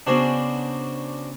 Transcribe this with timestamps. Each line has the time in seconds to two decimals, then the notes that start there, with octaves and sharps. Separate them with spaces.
0.07 C#3 B3 D4 F#4 C5